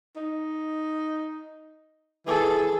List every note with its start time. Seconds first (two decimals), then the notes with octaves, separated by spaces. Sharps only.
0.16 D#4
2.26 E3 G#4 A4